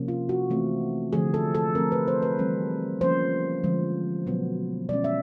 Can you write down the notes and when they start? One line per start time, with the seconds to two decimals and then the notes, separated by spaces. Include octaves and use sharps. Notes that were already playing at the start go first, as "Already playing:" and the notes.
Already playing: C3 F3 A#3 C#4
0.08 F4
0.29 F#4
0.50 E3 A3 C4
1.13 D3 F3 A3 G#4
1.34 A4
1.55 A4
1.75 F3 A3 C4 A#4
1.92 B4
2.08 C5
2.22 B4
2.38 E3 G3 C4
3.01 F3 A#3 C#4 C5
3.63 D3 F3 G#3
4.26 B2 F#3 B3
4.89 B2 G#3 C#4 D5
5.04 E5